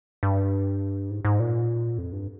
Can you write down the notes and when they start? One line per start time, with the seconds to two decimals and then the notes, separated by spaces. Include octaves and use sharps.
0.23 G2
1.10 G#2
1.25 G#2
1.40 A#2
1.98 F2
2.13 G2